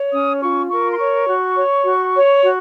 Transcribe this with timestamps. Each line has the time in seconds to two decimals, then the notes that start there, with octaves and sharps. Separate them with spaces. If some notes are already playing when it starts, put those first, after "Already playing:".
Already playing: C#5
0.12 C#4 D#6
0.42 F4 C#6
0.69 A#4 C#6
0.92 C6
0.98 C#5 C#6
1.28 F#4
1.56 C#5
1.84 F#4
2.14 C#5
2.42 F#4